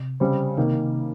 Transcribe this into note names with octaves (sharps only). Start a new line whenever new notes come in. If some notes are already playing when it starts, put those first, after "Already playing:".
Already playing: C3
C#3 G3 C4
C3 D#3 A#3